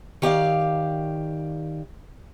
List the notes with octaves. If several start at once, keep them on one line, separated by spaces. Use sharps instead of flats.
D#3 G4 D5 F5